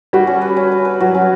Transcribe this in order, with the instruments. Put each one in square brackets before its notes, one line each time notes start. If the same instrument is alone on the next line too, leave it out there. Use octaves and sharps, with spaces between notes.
[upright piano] G3 [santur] F#4
[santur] C#4
B4
C#4
B4
B4
[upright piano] F#3 [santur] F#4
[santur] C#4